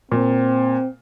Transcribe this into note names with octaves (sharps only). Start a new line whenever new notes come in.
A#2 C4